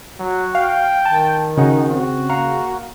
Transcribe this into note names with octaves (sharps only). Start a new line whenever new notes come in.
F#3 F#4
F5 G5
D#3 A5
C#3 C#4 D#4 F#4 F#5
C4 F#4
A#3 F5 F#5 A#5